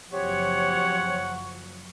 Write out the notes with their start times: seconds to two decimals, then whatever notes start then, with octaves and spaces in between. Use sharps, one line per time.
0.12 F#1 F3 F#3 C4 G4 C#5 F#5 C#6